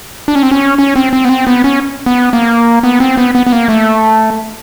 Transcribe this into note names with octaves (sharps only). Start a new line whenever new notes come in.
D4
C#4
C4
C#4
C#4
C4
C4
B3
C4
B3
C#4
B3
A#3
B3
C4
B3
B3
B3
A#3
A3